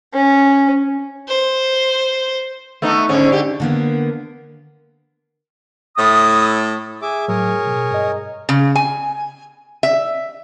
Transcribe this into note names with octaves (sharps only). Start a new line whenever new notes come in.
C#4
C5
A3 B3 D#4
G#2 D3 C#4
D3 G4
D3 A#3 B3
A2 D#6
G#4 E5 D6
A2 F#3 G#4 A#4 C#5
B2
G2 D#5
C#3
G#5
E5